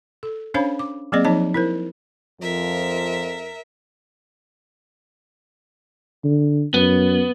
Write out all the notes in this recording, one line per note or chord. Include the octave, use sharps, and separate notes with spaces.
A4
C#4 D4 C5 C#5 F5 B5
D6
F#3 A#3 C4 G#4 D5 D#5
F3 D#4 C#5 D#5 A5
E4 A#4 C5
F2 F3 A#4 E5
D3
F#2 B3